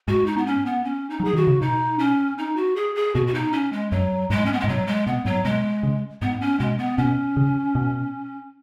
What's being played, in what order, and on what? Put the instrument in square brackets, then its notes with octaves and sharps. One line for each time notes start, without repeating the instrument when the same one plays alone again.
[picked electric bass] G#2 [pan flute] F#4
[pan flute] D#4
B3
C#4
B3
C#4
D#4
[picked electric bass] F#3
[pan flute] G#4
[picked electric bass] D#3 [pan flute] F#4
[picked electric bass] C#3
[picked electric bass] B2 [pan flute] D#4
[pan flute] C#4
D#4
F#4
G#4
G#4
[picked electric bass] B2 [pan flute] F#4
[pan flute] F#4
D#4
C#4
G#3
[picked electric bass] F#2 [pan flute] F#3
[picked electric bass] G#2 [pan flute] G#3
[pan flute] C#4
B3
G#3
[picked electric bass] G#2
[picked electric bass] B2 [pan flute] F#3
[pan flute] G#3
[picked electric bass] B2 [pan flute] B3
[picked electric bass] G#2 [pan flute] F#3
[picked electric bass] B2 [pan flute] G#3
[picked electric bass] C#3
[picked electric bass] G#2 [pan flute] B3
[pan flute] C#4
[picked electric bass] B2 [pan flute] G#3
[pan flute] B3
[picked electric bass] B2 [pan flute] C#4
[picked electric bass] C#3
B2